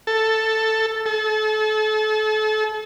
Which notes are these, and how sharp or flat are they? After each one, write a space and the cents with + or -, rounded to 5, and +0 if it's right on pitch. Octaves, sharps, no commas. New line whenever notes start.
A4 +5
A4 -35